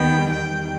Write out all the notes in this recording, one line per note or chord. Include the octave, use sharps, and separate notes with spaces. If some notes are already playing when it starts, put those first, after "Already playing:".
Already playing: D#2 D#3 B3 G5
E2 D#3 G3 G5